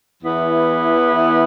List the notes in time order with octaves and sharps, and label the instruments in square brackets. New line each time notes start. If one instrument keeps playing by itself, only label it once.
[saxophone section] E2 E3 B3 E4